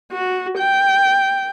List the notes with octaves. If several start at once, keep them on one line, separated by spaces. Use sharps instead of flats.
F#4
G5